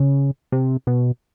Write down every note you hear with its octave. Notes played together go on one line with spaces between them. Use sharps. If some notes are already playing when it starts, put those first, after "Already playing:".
Already playing: C#3
C3
B2